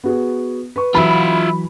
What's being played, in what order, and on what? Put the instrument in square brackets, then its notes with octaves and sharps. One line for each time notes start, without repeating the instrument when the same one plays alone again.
[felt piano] B3 F#4 G#4
B4 C#6
[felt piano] E3 F#3 [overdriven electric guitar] F4 E5 [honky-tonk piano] B5